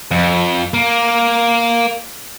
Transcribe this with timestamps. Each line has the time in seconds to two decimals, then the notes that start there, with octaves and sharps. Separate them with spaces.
0.11 F2
0.74 A#3